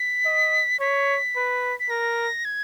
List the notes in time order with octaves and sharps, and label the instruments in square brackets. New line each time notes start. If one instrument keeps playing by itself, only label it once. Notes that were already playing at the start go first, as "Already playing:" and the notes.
Already playing: [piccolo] B6
[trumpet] D#5
[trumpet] C#5 [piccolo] B6
[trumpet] B4
[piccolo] B6
[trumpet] A#4 [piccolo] A#6
[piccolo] G#6